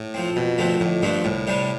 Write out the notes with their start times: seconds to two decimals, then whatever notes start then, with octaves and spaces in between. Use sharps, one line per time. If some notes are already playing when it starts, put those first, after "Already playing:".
Already playing: A2
0.14 F3 C4
0.36 F2 B2
0.58 D3 F3 A3 C4
0.80 F2 A2
1.02 G2 D3 F3 A3 C4
1.24 C2 A2
1.47 C3 G3 D4 G4